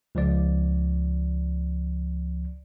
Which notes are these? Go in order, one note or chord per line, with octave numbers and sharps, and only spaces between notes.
C#2 F3 D5